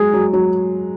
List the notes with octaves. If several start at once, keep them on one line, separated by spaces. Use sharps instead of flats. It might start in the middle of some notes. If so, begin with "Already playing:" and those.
Already playing: F#3 G#3 G#4
F#3
F#3